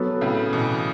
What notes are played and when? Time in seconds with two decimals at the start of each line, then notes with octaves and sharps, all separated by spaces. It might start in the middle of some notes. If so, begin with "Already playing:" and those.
Already playing: F#3 B3 A4 C#5
0.21 A2 C#3
0.53 B2 E3